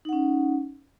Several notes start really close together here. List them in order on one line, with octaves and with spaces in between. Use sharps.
D#4 F#5 C#4